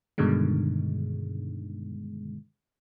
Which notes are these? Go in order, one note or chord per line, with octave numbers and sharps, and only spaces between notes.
G2 B2 D3 D#3 G#3